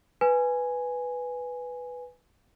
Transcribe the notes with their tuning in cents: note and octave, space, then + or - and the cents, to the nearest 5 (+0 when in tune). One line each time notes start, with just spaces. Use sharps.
B4 +0 G#5 +0